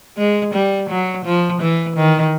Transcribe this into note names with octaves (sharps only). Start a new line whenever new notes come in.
G#3
G3
F#3
F3
E3
D#3